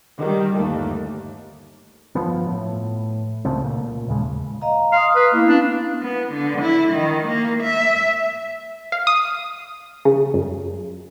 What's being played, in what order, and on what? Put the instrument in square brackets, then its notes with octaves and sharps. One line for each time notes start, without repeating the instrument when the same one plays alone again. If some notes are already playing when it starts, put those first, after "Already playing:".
[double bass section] D#3 G3
G1 D#2 A3
[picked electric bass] G1 F3 B3
A2
C#2 C#3 A3 C4
A#2
A1 D#2 C#3 G#3
[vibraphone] D#5 F5 A#5
[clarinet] F5 [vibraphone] C6 D#6
[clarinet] B4
[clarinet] A#3 [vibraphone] B3 E4
[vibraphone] C#4 F5 [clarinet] D4
[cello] B3
D3
E4
D#3
A#3
E5
[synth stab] F5
D#6
C#3
F#2